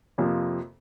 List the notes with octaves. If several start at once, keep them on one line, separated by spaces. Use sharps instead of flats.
F2 C3 F3 A#3